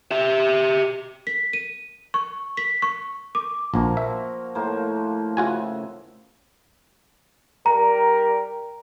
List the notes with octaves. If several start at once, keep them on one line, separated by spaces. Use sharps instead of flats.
G4 E5
B6
D#7
C#6
B6
C#6
D6
A#1 F3 A#3 F#4
E5
A2 A#3 C5
C#3 F4 F#4 E5 G#5 C6
G3 A#4 A#5